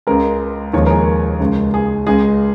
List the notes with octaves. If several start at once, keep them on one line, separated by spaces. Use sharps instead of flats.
C#2 C#3 G#3 A#4
D#2 C#3 F3 G#3 C#5
A#4
G#4
C#2 C#3 G#3
G#4
C#2 C#3 G#3 G#4